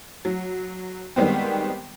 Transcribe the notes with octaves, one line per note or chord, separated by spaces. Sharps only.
F#3
D#3 G3 G#3 B3 C4